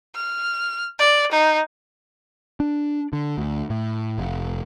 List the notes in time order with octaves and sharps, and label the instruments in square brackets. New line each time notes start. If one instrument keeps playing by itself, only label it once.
[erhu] F6
D5
D#4
[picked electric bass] D4
D3
D2
A2
F1